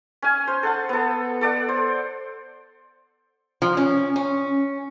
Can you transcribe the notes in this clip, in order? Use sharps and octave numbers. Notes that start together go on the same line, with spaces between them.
C#4 G#5
C5
A4 F#5 A5
B3 A4
A4 D5 F#5
C5
F3
C#4
C#4